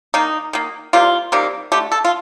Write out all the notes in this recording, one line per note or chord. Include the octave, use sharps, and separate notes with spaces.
D#3 A#3 D#4
D#3 A#3
C3 G3 A#3 F4
C3 D#3 G3 A#3
D3 A3 G4
A4
F4